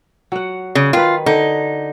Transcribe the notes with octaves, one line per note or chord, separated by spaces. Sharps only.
F#3 F#5
C#3
D#3 F4 B4
D3 D#4